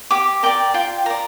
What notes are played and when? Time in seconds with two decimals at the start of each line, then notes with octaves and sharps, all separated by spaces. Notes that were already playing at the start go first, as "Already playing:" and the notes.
0.11 G4 D6
0.43 A#4 D5 G5
0.74 F4 G5
1.06 A#4 D5 A#5